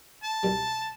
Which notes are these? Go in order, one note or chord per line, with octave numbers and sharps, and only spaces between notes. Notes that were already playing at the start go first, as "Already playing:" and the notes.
A5
C2 B2 G3